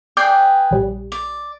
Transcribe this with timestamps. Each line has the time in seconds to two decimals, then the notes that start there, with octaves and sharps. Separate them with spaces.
0.17 G#4 B4 D5 G5 G6 C7
0.71 A#1 G3
1.12 D5